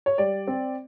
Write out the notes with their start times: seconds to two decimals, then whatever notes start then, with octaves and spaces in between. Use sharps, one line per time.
0.06 C#5
0.18 G3 D5
0.47 C4